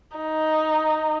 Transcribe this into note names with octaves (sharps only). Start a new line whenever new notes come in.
D#4